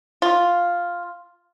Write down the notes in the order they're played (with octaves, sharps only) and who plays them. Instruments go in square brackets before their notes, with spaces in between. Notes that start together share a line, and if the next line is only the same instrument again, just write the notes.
[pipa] F4